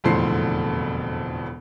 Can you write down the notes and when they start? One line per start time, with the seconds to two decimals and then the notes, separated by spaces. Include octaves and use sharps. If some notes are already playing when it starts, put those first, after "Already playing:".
0.04 E1 F2 A2 D3 C5 C7